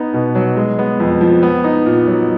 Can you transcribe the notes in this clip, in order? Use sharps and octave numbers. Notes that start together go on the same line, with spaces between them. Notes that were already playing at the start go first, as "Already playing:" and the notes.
Already playing: B3 D#4
B2
F#3
G#3
B3
F2
F3
B3
D#4
A#2
F#3